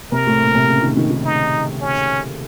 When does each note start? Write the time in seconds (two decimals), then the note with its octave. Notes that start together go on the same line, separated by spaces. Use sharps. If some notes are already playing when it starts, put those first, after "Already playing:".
0.12 C3 A#4
0.27 A2
0.41 A#2
0.55 C3
0.68 C#3
0.82 D#3
0.97 D#3
1.11 D#3
1.25 D#4
1.81 C#4